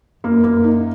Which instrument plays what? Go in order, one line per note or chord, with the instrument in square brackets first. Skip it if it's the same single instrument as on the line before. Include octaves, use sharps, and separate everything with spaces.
[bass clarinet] F#2 [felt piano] A#3
[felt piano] A#3
D#4